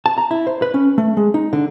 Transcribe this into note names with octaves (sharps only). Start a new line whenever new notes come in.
A5
A#5
E4
C5
B4
C#4
A3
G#3
D#4
D3